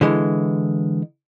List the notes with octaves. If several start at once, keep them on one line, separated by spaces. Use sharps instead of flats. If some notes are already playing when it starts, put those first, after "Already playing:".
D3 E3 G#3